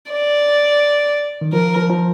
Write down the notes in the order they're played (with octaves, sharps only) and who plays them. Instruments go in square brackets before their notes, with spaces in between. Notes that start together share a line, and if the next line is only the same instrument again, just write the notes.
[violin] D5
[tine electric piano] D#3
[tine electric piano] F3 [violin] A#4
[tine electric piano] F3
F3